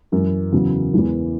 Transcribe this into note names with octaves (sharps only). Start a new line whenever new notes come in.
F#2 E3
E2 C#3 F#3
E2 E3 E4